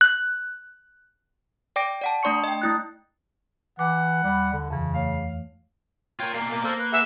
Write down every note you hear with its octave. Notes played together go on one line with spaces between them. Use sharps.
F#6
D5 G5 D6 A#6 D7
D5 F#5 A5
A3 D4 D5 C6 C#6 C#7
D#5 G5
A3 E4 F#6
E3 F#5 D6
D#2 G3 B5
D3
F2 C#3 E3
A3 C#5 F5
F4 A#4 C#5 G5
B2 A#3 D5 F5
A#3 D6
A#3 A4 C5 F5
B4
G#4 B4 E5 F#5